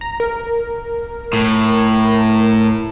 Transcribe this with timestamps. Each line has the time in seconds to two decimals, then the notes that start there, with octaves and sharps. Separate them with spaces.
0.01 A#5
0.20 A#4
1.33 A2